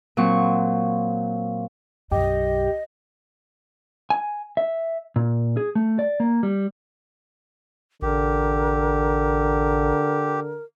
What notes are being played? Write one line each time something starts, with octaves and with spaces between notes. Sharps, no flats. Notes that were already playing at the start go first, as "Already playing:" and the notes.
A#2 F#3 C4 C#6
B1 F#2 G4 D#5
G#5
E5
A#2
G#4
A3
D5
A#3
G3
A1 D3 G4 A#4